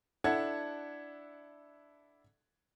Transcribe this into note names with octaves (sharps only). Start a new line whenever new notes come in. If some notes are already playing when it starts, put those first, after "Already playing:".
D4 E4 A4 F#5 G#6